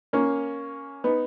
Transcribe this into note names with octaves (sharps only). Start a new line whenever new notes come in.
A#3 C#4
B3 D#4